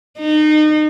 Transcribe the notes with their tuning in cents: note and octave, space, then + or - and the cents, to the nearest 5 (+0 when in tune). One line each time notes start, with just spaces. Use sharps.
D#4 -30